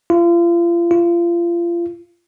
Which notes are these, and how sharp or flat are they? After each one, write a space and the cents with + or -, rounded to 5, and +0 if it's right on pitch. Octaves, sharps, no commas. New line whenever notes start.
F4 -35
F4 -30